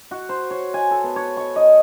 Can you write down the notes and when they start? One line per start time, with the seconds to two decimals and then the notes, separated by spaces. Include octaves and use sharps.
0.11 F#4
0.29 C5
0.51 C#5
0.74 G#5
0.91 A4
1.04 B3
1.16 C#5
1.37 C#6
1.56 D#5